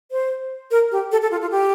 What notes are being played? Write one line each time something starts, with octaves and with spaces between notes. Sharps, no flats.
C5
A#4
G4
A4
A4
F4
F4
G4